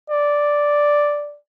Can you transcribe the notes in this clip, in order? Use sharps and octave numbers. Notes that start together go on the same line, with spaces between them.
D5